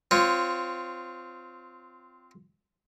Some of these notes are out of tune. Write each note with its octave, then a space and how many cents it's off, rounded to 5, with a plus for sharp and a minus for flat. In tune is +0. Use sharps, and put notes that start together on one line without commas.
C4 -15 F4 +0 C#5 +0